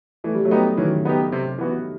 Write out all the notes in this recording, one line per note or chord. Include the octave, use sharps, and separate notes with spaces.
E3 A3
G3
F#3 A3
B3 D#4 G4
D#3 E3 F#3
B3 D#4 G4
C3
E3 B3 F#4